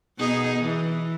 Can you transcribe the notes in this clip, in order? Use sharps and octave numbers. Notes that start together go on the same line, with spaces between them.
B2 D#4 G#4
E3